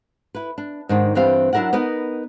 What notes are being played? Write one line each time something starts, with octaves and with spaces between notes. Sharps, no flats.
E4 B4
D4
G#2 D#3 D4
G2 E3 C4 G4 F5
F#3 D4 E4 A#4 D5 F#5
B3 D#4 A#4 B4